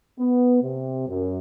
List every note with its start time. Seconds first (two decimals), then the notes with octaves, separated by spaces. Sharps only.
0.19 B3
0.62 C3
1.08 F#2